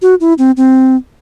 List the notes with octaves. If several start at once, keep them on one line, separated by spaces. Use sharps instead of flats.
F#4
E4
C4
C4